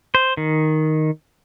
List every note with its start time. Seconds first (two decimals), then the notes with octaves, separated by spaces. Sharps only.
0.15 C5
0.37 D#3